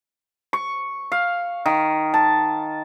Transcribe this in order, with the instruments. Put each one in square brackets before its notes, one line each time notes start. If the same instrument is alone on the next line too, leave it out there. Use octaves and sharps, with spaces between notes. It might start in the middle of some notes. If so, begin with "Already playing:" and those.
[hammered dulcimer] C#6
F5
D#3
A5